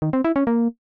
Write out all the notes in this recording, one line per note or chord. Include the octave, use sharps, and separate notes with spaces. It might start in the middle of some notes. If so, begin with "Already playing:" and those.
D#3
C4
E4
C#4
A#3